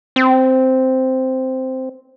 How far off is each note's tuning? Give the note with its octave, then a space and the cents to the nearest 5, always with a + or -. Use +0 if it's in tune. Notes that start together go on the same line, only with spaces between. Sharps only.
C4 -5